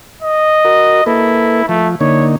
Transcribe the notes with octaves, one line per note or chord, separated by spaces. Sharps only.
D#5
F#4 A#4
A#3 E4 A4 B4
F3 A3
D3 A#3 D#4 C#5